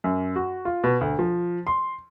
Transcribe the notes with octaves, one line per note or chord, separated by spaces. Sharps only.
F#2
F#4
F4
B2
D2
F3
C6